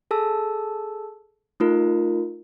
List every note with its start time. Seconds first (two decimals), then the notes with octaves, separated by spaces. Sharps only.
0.11 G#4 A4 A5 E6
1.60 A3 D#4 F4 A#4